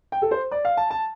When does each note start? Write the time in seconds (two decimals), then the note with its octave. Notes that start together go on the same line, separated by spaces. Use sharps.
0.12 G5
0.22 A4
0.31 C5
0.51 D5
0.65 F5
0.77 A5
0.91 A5